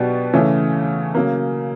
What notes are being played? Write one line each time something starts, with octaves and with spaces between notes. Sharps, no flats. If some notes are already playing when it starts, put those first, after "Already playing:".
Already playing: B2 F#3 B3 D4 G4
C#3 E3 A3 C#4
C#3 F#3 A#3